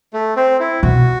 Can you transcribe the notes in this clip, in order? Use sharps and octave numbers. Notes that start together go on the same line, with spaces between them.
A3
C4
E4
B2 F#4